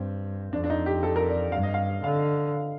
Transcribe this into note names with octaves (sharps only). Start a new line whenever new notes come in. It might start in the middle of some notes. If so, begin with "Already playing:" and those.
Already playing: G2 C4
F2 D4
D4
D#4
G4
A4
A#4
D5
G2 F5
D#5
F5
D3 F5